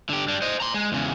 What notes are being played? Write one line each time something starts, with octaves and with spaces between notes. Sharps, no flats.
D3 G4
G3 D4
C5 D#5
A#5 C6
G#3
E2 C#3